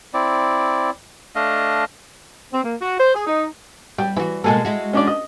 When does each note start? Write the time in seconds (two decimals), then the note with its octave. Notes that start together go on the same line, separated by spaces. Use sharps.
0.14 C4 E4 D5
1.35 A3 D4 D#5 F5
2.52 C4
2.63 A#3
2.80 F#4
2.98 C5
3.13 G#4
3.25 D#4
3.98 G3 G5
4.16 E3 E4 F#4
4.44 B2 G#3 A#3 A4 G#5 A5
4.65 G#3 E4 F#4
4.93 C#4 D4 D5
5.07 D#5